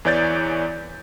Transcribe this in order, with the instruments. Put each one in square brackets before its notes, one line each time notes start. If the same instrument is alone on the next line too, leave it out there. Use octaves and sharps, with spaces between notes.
[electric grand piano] E2 E3 C#5 D5 G6 A6